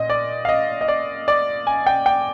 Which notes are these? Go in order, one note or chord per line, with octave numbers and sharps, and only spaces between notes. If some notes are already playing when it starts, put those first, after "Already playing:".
Already playing: A#2 D#5
D5
F5
D#5
D#5
D5
D5
G#5
G5
G5